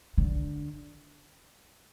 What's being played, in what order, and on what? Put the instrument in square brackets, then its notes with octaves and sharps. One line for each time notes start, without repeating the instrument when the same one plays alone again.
[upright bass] D3